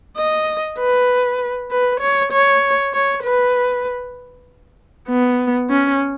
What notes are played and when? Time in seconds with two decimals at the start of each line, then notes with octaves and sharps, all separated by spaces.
0.17 D#5
0.79 B4
1.71 B4
2.01 C#5
2.32 C#5
2.93 C#5
3.23 B4
5.08 B3
5.70 C#4